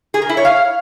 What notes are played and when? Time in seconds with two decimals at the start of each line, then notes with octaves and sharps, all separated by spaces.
0.14 G#4
0.22 A#4
0.29 E4
0.37 C#5
0.45 F5